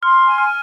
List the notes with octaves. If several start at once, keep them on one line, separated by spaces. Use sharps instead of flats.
C6 F6
G#5
F6